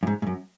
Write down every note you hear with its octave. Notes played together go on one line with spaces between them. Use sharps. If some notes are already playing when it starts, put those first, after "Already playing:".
F#2
G#2
G#2
F#2